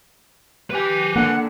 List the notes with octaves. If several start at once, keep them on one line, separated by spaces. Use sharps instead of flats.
G4 B4 G#5
D3 A#3 D4 F#5